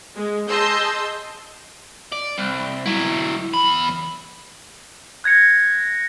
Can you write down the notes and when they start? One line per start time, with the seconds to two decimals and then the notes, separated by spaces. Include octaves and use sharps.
0.15 G#3
0.49 G#4 D#5 A5 C6 E6 G6
2.12 D5
2.38 C2
2.86 F#3 E4
3.54 E2 B5
5.24 F#6 G#6 A#6 C#7